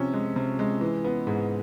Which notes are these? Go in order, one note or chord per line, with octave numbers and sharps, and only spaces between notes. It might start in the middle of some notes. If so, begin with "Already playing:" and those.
Already playing: C3 F3 C#4
G#3
C3
G#3
E3
B3
G#2